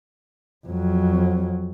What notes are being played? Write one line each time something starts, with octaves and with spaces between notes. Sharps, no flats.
F2 F#3